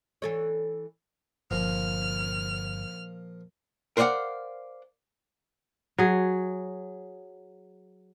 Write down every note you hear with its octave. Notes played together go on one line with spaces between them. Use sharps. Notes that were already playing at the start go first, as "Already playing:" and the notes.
E3 A4 C#5
G1 A#2 F3 F6
A#4 C5 D5 D#5 F5 F#5
F#3 G#4